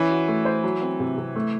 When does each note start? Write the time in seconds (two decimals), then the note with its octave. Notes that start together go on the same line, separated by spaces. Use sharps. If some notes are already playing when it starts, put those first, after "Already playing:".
Already playing: E3 C#4
0.10 F#4
0.28 A3
0.45 C5
0.64 F#3
0.82 C4
1.00 C3
1.17 C3
1.36 A3